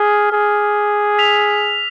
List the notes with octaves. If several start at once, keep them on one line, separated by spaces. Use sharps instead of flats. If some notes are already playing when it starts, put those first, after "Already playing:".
Already playing: G#4 D6 F6 B6
G#4
E6 B6 F7